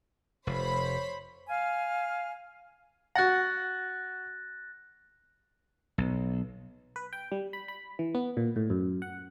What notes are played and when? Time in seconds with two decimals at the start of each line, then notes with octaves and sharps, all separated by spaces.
0.47 F1 C5 C#5 B5
1.50 F5 G#5 F6
3.15 F#4 F#5 F#6 A6 A#6
5.98 B1
6.96 B4
7.13 G5
7.32 G3
7.53 B5
7.68 B5
7.99 E3
8.15 B3
8.37 A#2
8.56 A2
8.70 F#2
9.02 F#5